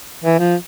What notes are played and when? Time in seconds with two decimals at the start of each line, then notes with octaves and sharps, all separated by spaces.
0.24 E3
0.39 F3